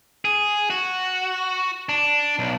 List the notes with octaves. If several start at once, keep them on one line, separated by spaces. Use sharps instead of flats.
G#4
F#4
D4
B1